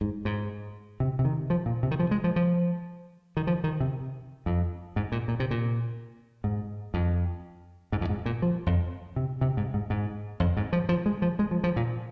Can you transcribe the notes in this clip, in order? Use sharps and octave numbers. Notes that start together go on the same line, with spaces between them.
G#2
G#2
C3
C3
D#3
F3
A#2
C3
D#3
F3
G#3
F3
F3
D#3
F3
D#3
C3
F2
G#2
A#2
A#2
C3
A#2
G#2
F2
G#2
F2
G#2
A#2
F3
F2
C3
C3
G#2
G#2
G#2
F2
G#2
F3
F3
G#3
F3
G#3
F3
F3
A#2